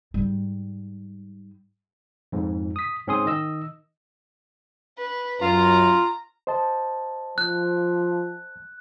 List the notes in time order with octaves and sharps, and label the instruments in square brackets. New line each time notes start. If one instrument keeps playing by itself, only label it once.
[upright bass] G#2 G3
[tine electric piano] F2 G#2
D#6 B6
G#2 C4 C#4 G#4 C6 D#6
D#3 D#5 E6
[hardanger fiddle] B4
[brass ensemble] F#2 [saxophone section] F4 [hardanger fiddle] A#5
[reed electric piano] C5 D#5 A5
[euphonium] F3 [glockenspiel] F#6